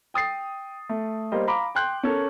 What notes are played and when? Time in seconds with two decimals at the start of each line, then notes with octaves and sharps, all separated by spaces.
0.14 G5 D#6 A6 C7
0.89 A3
1.32 G3 A#3 C5 D#5
1.47 F5 A#5 B5 D6
1.75 G5 C6 F#6 G6
2.03 C#4 A4 A#4